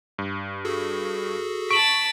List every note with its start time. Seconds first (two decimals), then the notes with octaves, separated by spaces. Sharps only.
0.18 G2
0.65 F#4 G#4 A4
1.71 A5 C#6 B6 D7 F#7